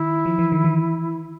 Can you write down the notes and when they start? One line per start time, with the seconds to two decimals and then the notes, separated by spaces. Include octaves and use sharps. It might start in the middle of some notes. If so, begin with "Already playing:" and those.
Already playing: D#3 E4
0.26 F3
0.39 E3
0.52 D#3
0.65 E3